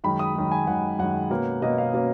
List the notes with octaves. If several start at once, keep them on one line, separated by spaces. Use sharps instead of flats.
F#2 D#3 G#3 B5
D#6
F#2 D#3 G#3
G#5
F#2 D#3 G#3 F#5
F#2 D#3 G#3 F#5
B2 A#3 C#4
B2 A#3 C#4 D#5
F5
B2 A#3 C#4